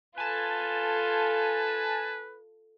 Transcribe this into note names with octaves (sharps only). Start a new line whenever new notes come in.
F4 A4 B4 G#5 A5